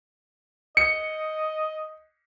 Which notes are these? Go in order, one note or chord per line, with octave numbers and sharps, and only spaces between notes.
D#5 C#7